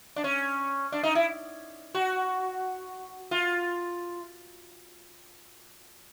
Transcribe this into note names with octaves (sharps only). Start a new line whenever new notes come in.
D4
C#4
D4
D#4
E4
F#4
F4